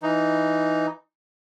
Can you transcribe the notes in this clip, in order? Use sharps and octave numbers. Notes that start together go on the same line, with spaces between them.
E3 D#4